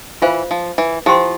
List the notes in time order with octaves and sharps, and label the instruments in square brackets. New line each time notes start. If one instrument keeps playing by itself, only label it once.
[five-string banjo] E3 [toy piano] F4 C5 F5
[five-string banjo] F3
E3
[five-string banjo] F3 [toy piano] E4 G4 C5 G5 C6